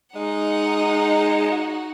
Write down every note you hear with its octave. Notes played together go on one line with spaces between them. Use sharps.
G#3 D#4 F#5
F#4